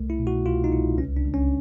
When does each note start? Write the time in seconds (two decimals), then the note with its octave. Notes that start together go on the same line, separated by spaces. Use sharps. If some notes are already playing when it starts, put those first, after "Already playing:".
Already playing: C2 A3
0.10 E4
0.19 B2
0.27 F#4
0.45 C2 F4
0.64 D#4
0.72 C2 E4
0.98 C#2 C#4
1.17 D4
1.25 C#2
1.34 C#4